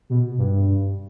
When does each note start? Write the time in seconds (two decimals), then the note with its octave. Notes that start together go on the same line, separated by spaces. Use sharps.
0.10 B2
0.38 G2